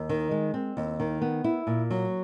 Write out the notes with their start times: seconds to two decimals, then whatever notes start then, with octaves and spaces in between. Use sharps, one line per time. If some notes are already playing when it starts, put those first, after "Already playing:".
Already playing: D#2
0.09 D#3
0.31 G#3
0.54 C4
0.77 D#2
1.00 D#3
1.22 B3
1.44 E4
1.67 A#2
1.90 F#3